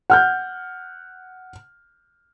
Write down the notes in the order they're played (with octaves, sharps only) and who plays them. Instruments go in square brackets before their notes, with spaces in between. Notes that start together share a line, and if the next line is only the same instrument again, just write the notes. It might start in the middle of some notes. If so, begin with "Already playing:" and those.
[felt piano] F#5 F6 G6